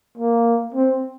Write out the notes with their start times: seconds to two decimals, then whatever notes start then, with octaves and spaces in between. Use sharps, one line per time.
0.18 A#3
0.75 C4